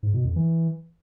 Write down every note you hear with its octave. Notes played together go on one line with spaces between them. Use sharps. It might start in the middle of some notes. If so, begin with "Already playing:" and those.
G#2
B2
F2
E3